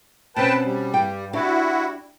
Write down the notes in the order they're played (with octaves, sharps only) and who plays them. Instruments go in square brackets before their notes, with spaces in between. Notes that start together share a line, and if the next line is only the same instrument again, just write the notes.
[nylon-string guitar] B2 C4 C#4 [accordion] B4 G5 A5
[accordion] G3
[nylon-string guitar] G2 G5
[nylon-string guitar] D4 G4 [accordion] E4 F#4